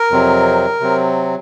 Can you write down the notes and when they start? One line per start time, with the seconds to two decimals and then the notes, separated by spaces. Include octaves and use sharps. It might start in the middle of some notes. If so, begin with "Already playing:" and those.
Already playing: A#4
0.11 F2 C3 F#3 C4
0.80 C3 F#3 C4